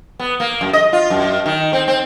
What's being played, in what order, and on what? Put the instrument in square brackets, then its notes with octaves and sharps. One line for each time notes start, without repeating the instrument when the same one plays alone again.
[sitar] B3
A#3
F#2
D#5
F4
F#2
D#3
C4
C4